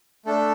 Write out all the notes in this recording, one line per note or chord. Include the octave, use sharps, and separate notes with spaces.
A3 D4 A4